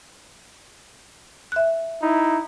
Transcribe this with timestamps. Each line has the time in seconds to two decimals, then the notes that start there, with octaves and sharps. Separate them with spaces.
1.52 E5 F#6
2.02 D#4 E4